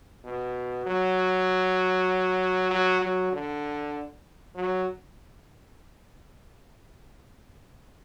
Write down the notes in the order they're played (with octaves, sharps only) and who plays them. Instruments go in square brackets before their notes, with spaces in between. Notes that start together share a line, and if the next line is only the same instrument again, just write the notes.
[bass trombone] B2
F#3
F#3
F#3
D3
F#3